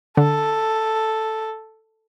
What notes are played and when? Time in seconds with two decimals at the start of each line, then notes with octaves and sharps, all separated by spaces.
0.17 D3 A4